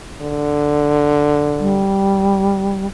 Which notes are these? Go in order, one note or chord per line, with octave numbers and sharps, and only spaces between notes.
D3
G3